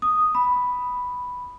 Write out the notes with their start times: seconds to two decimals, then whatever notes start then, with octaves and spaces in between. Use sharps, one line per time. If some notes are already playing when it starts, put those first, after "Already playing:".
0.02 D#6
0.35 B5